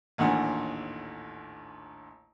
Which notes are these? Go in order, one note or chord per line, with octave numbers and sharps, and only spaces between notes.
A1 D#2 A#2 D3 F#5 G#5